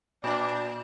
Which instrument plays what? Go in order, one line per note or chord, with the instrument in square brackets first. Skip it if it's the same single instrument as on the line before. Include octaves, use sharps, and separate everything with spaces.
[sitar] A#2 [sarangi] D4